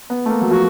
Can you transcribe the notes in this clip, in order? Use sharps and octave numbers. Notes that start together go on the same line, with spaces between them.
B3
A3
A#3
F#3
F3 F#4